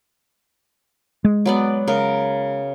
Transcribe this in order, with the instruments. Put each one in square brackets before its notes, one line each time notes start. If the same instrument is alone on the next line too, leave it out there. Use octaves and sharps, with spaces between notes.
[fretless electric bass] G#3
[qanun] F#3 B3 D5
C#3 A#4